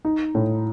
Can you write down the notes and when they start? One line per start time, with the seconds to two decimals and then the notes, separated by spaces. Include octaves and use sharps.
0.05 D#4
0.35 A2